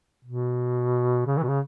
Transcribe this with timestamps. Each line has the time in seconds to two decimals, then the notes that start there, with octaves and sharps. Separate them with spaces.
0.25 B2
1.26 C#3
1.37 E3
1.43 B2
1.48 C#3